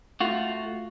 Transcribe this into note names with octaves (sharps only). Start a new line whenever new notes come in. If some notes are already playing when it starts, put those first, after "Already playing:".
A3 F4 F#4